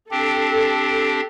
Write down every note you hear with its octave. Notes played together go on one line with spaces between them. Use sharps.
C4 D4 G4 A4